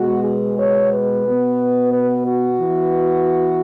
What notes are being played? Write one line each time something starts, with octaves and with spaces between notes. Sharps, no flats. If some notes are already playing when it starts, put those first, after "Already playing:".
Already playing: B2 G#3 B3 F#4
G#4
C#5
B4
B2 B3
B4
F#4
E3 B3